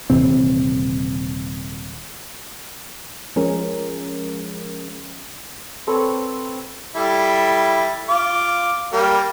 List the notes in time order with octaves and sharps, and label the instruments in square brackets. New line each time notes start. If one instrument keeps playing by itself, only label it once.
[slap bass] D#1 C3 E3 C4
[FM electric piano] F3 G#3 C#4 G#4 A#4
[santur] C4 A4 B4 C#5
[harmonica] G3 E4 A4
F4 D6
G3 A#3 A#4